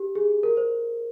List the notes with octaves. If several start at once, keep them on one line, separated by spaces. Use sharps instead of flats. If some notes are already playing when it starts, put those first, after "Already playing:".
Already playing: G4
G#4
A#4
C5